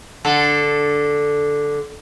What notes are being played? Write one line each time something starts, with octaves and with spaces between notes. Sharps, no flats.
D3 A4